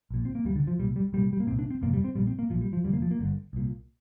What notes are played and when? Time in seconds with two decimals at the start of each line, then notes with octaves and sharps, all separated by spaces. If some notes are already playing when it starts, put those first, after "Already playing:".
0.10 A#1 A#2
0.25 C4
0.35 A#3
0.45 D2 D3 G3
0.56 D3
0.67 F3
0.79 C2 A#2 G3
0.96 G3
1.13 C2 A#2 G3
1.33 G3
1.40 A#3
1.47 C2 A#2 C4
1.59 D4
1.71 C4
1.81 G1 F2 C3 A#3
1.93 G3
2.04 C4
2.15 A#1 A#2 G3
2.27 C4
2.39 A#3
2.50 A#1 A#2 F3
2.61 G3
2.73 F3
2.84 F1 F2 D3 G3
2.93 A#3
3.02 F3
3.11 A#3
3.19 G1 G2 D3
3.53 C2 A#2